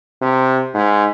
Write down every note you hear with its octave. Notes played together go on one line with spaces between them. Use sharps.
C3
G#2